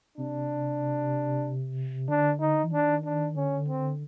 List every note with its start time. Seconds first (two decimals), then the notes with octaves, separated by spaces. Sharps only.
0.18 C3 D4
2.09 D3 D4
2.40 D#4
2.64 E3
2.72 D#3 D4
3.05 D4
3.36 D3 C#4
3.68 C4